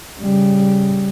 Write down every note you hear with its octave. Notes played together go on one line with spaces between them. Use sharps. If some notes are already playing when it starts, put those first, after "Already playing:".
C#3 G3